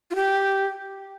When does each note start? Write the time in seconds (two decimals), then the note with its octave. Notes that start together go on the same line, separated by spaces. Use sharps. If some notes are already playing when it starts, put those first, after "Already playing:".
0.11 F4
0.15 G4